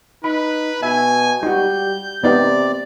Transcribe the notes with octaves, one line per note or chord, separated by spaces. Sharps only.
D#4 B4 B5
B2 E5 G#5
G3 D#4 F#4 G6
C3 B3 D#4 G4 D5